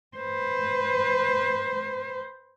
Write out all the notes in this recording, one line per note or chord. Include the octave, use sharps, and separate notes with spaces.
B4 C5